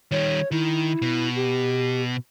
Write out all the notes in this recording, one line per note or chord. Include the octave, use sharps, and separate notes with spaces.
D#3 G3 C#5
D#3 E4
B2
G4